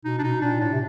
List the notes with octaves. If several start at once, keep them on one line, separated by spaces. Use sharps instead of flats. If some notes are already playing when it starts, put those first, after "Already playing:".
B2 D#4
D4
B2 D#4
A#2 D4
A2 D4
C3